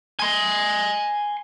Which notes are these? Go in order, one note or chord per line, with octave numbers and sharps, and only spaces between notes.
G#5 C6